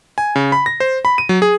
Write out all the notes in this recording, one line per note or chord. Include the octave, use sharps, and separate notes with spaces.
G#5
C#3
B5
A#6
C5
B5
D#7
F#3
G#4